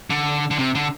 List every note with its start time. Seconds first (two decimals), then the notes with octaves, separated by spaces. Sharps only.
0.10 D3
0.51 D3
0.59 C3
0.75 D3